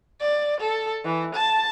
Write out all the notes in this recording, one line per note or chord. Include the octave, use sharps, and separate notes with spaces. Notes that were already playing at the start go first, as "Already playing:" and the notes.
D5
A4
E3
A5